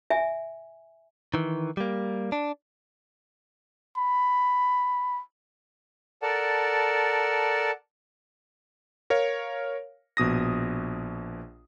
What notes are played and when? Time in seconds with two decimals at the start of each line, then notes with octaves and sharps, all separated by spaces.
0.10 E5 G#5
1.34 D#3 E3
1.77 G3 A#3
2.32 D4
3.97 B5
6.22 A4 A#4 D5 F#5 A5
9.10 A#4 C#5 F5
10.17 A#1 B2 D#6 A#6